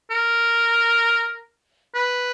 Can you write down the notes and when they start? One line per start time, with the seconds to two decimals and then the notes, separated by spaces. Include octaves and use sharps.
0.10 A#4
1.95 B4